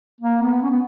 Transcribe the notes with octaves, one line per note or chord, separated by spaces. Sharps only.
A#3
B3
C#4
B3